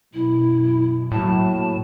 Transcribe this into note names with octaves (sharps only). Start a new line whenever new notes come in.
F#2 B2 E4
A2 F#3 A#3 A5